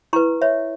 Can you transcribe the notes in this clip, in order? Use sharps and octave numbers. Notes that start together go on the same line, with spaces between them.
E4 B4 A#5 C#6
C#5 E5